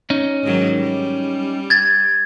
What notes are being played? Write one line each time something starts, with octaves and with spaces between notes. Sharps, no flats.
C#4 D#4
G#2 D#3 F#3
G3
G#6 A6